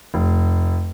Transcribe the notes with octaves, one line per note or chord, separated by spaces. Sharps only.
F1